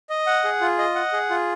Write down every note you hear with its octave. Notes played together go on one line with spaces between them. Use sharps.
D#5
F#5
G#4
F4
D#5
F#5
G#4
F4